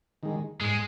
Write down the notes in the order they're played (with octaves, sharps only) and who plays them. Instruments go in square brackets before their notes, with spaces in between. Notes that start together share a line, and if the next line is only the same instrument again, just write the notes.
[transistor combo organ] D#3 G#3
[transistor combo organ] G#2 [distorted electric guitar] G#3